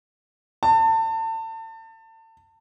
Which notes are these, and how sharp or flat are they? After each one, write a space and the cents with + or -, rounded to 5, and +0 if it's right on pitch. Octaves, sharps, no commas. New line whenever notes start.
A5 +30